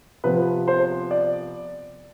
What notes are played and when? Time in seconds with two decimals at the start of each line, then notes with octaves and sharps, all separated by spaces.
0.24 C3 F3 B3 B4
0.68 C5
1.11 D5